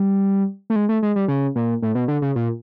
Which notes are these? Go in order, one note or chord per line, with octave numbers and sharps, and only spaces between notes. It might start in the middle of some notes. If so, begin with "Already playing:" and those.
Already playing: G3
A3
G#3
A3
G#3
G3
C#3
A#2
A2
B2
D3
C#3
A#2